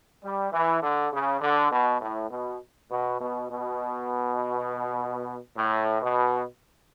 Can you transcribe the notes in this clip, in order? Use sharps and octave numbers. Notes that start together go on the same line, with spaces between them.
G3
E3
D3
C#3
D3
B2
A2
B2
B2
B2
B2
A2
B2